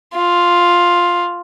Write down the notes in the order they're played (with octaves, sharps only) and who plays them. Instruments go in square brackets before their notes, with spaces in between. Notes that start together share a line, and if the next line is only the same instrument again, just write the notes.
[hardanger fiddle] F4